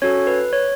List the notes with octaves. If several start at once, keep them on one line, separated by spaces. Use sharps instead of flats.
C#4 F#4 A4 C#5
B4
C#5